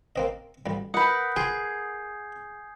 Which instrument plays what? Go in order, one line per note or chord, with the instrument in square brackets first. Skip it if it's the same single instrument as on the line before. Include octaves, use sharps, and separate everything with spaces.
[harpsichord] A#3 C4 D#5
A1 G3
[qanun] A#4 B4 [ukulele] F#5 B5 [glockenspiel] D#6 G6
[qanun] G#4 [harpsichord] G5 C6 [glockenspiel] G#5 G#6 C7